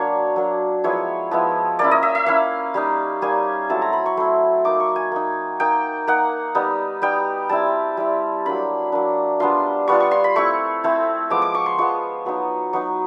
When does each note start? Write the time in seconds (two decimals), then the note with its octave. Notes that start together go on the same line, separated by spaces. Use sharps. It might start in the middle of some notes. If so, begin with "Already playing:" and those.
Already playing: F#3 A#3 D4 C#5
0.36 F#3 A#3 D4
0.84 F3 G#3 B3 E4 C#5
1.31 F3 G#3 B3 E4
1.79 A#3 C#4 E4 D5
1.91 D#5
2.03 E5
2.15 E5
2.26 A#3 C#4 E4 F5
2.74 G3 A#3 D#4
3.22 G3 A#3 D#4 G#5
3.69 F#3 A3 C4 E4 A5
3.82 A#5
3.93 B5
4.06 C#6
4.17 F#3 A3 C4 E4 C6
4.65 A#3 D#4 D6
4.80 C#6
4.96 G#5
5.12 A#3 D#4
5.60 A#3 D#4 G5
6.07 A#3 D#4 F#5
6.55 G3 B3 D#4
7.02 G3 B3 D#4 G5
7.49 G3 C4 E4 A5
7.97 G3 C4 E4
8.45 F#3 A#3 D4 B5
8.92 F#3 A#3 D4
9.40 G3 B3 D4 F4 C6
9.87 G3 B3 D4 F4 C#6
10.00 C#6
10.11 C6
10.24 B5
10.35 A3 C4 E4 C#6
10.84 A3 C4 E4
11.30 F3 G#3 B3 D6
11.42 D6
11.54 C#6
11.66 C6
11.78 F3 G#3 B3 C#6
12.25 F#3 B3 D#4
12.73 F#3 B3 D#4 C#6